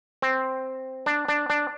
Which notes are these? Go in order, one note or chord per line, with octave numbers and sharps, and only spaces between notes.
C4
D4
D4
D4